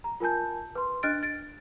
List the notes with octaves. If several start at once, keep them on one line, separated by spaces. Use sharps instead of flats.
A#5
F4 A#4 G#5 A5 G6
B4 C6
D4 D#5 F6 F#6 A6 D7
A6 D7